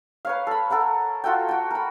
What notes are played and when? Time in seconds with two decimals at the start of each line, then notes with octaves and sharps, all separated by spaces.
0.25 B4 C#5 F5
0.47 A4 B5
0.70 A4 A#4 F#5 A#5
1.24 F4 F#4 A4 G5
1.49 F#4 G5
1.71 A#4 B5